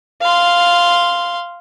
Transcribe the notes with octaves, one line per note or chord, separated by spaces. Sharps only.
F5 C6